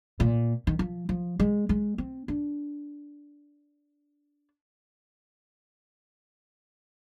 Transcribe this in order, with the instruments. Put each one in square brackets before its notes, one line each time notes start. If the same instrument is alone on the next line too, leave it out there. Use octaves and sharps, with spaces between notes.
[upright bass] A#2
D#3
F3
F3
G#3
G#3
C4
D4